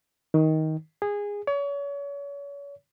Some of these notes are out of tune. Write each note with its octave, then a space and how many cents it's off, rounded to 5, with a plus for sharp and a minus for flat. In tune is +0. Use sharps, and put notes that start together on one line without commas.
D#3 +15
G#4 -20
C#5 +35